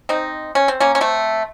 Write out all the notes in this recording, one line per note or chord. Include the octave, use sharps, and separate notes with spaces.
C4 D#4
C#4
C4
A#3 C#4
C#4
A3 C4